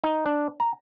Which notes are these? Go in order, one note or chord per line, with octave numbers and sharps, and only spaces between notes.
D#4
D4
A#5